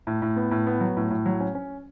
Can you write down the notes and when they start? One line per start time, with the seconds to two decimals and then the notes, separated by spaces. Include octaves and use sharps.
0.07 A2
0.22 A2
0.36 B3
0.51 A2
0.66 B3
0.81 F#3
0.97 A2
1.10 A2
1.26 F#3
1.40 C#4
1.55 C#4